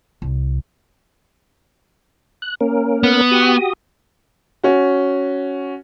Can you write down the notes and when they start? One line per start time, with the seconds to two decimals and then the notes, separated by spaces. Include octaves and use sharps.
0.22 C2
2.42 F#6
2.61 A#3 C#4 A#4
3.03 B3
3.31 F#4 G4 D#6
4.64 C#4 F#4